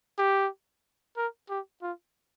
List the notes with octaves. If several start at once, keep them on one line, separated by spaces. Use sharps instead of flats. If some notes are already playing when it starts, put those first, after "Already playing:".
G4
A#4
G4
F4